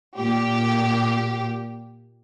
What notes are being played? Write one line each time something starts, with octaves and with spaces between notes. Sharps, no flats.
A#2 G4